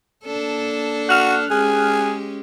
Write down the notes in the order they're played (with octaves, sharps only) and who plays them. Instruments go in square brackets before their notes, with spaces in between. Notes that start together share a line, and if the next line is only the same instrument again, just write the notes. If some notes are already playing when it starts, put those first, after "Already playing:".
[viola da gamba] A#3 D4 A4
[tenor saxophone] F#4 [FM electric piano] F6 F#6
[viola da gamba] G#3 C#4 G4 [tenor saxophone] G#4